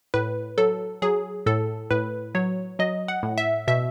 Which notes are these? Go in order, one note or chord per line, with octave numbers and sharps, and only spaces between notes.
A2 B4
F#3 A4
F#3 G#4
A2 A4
A2 B4
F#3 C#5
F#3 D#5
F#5
A2
E5
B2 E5